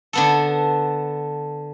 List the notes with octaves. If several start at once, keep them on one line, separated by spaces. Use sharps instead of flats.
D3 B3 A4